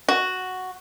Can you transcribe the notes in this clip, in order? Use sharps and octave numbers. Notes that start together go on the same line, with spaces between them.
F#4